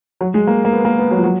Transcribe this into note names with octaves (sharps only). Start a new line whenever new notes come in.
F#3
G#3
A#3
A#3
B3
A#3
B3
F#3
F3
F#3